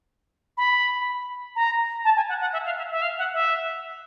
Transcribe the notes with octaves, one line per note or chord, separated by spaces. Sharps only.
B5
A#5
A5
G#5
F#5
F#5
E5
F5
E5
E5
F5
F#5
E5